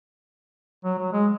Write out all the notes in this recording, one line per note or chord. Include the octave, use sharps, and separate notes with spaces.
F#3
F#3
G#3